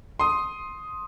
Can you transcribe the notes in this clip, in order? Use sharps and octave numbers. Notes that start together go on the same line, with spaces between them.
C6 D#6